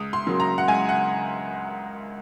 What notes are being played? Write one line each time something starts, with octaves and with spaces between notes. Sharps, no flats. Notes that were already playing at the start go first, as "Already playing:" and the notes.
Already playing: C#2 D#6
C6
C#3 F#3 A#3
A#5
F#5
C#2 G#5
F#5